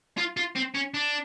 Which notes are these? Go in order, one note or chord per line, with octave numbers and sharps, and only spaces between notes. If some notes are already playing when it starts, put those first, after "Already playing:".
F4
F4
C4
C#4
D4